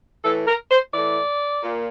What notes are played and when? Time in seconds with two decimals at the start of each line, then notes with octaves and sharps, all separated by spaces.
0.24 A2 E3 A4
0.47 A#4
0.70 C5
0.93 A2 E3 D5
1.62 A#2